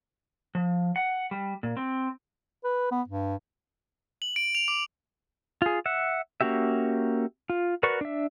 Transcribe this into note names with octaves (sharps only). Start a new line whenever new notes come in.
F3
F#5
G3
A#2
C4
B4
B3
G2
F#7
D7
F7
D6
F4 G#4
E5 F#5
A#3 C#4 F#4 G4 E5
F4
F#4 A#4 B4 D5 C#6
D4 E5